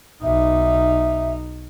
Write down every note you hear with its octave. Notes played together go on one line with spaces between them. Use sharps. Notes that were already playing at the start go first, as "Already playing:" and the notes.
B1 D#4 E5